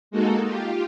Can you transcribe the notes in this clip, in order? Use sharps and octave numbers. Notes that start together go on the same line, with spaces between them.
G#3 A#3 D#4 F#4 A4
F4 G4